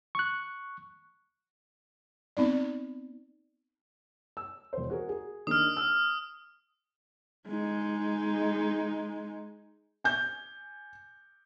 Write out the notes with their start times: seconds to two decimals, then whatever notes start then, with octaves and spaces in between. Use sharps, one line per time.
0.15 C#6 F#6
2.37 B3 C4 D#4 D5
4.37 E6
4.73 E1 C5
4.89 F#4 G#4 A#4
5.09 G#4
5.47 D#3 A#3 D4 D#6 F6
5.77 E6
7.48 G#3 D#4
10.04 G#5 G6